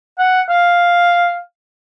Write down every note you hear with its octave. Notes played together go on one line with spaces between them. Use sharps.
F#5
F5